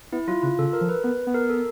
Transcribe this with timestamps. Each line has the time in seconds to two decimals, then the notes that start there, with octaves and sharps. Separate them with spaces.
0.12 B3 E4
0.27 F#3 F4
0.43 C#3 F4
0.58 C#3 A4
0.73 A#4
0.81 F3
0.89 B4
1.04 B3 B4
1.27 B3
1.34 A#4
1.49 A4